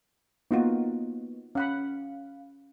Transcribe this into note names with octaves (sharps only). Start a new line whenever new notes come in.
A#3 B3 D#4 F4 F#4
C#4 F5 F#5 B5